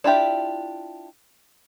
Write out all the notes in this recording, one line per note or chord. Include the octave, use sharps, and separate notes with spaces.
D4 E4 F4 G4 E5